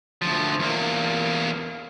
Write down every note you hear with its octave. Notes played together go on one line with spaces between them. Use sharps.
D2 F3
E2 A#3